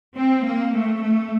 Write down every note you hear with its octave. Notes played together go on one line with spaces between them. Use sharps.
C4
A#3
A3
A3